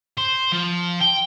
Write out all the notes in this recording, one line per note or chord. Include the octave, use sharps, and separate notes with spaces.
C5
F3
G5